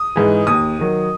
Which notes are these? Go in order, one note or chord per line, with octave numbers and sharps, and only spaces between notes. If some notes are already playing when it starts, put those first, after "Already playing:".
Already playing: D#6
G#2 E3
D#2 D#6
D#3 F#3